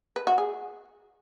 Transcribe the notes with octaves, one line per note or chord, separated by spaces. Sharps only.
B4
F#4
G#4